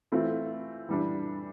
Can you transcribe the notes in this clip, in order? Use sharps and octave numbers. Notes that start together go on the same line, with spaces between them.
E3 A3 C4 F4
E3 G3 D4